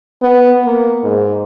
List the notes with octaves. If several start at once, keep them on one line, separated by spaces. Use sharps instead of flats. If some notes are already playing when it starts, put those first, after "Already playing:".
B3
A#3
G#2